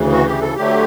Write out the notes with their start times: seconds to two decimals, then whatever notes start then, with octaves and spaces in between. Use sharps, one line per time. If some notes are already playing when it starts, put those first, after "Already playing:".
Already playing: D2 C#3 E3
0.13 F#4
0.27 G4
0.42 A4
0.56 D2 D3 F#3 A3 G4